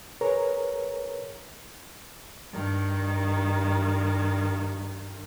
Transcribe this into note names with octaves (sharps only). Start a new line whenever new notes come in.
G#4 A#4 B4 C#5 A#5
G2 D#3